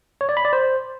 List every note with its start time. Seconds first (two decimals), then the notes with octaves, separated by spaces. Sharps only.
0.21 C#5
0.29 D5
0.37 B5
0.45 D5
0.53 C5